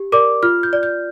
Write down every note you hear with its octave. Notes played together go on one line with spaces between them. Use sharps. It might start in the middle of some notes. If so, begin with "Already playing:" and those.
Already playing: G4
A#4 D5 D6
F4 F6
G6
D5
G6